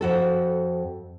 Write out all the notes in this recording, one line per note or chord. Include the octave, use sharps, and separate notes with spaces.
F2 F#4 A4